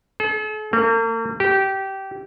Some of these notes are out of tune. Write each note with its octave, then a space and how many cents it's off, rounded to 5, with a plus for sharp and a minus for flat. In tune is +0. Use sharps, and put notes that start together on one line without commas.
A4 -45
A#3 -40
G4 -20